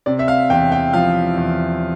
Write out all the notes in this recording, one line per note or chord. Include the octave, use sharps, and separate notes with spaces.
C3 D5
E5
F5
E2 G5
G5
F3 F5
E2